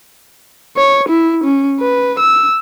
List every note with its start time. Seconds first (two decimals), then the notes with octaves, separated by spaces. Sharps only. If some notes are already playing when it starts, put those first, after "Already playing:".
0.77 C#5
1.09 E4
1.44 C#4
1.80 B4
2.19 E6